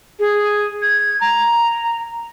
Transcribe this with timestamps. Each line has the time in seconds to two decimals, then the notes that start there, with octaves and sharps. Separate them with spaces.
0.20 G#4
0.82 G#6
1.21 A#5